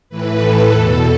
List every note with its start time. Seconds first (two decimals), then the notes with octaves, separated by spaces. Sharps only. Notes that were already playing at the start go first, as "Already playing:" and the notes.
0.09 A2 E3 B4
0.40 A4
0.72 E2 B2